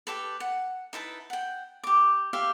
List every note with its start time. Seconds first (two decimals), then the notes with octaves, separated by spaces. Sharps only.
0.07 G4 A4 B4
0.40 F#5
0.93 D#4 E4 B4 A5
1.30 F#5 G5
1.83 G4 D6
2.33 G4 E5 F5